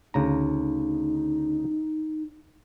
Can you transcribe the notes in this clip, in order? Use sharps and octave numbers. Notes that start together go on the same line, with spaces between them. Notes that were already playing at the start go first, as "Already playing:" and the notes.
D2 C#3 D#4 A#5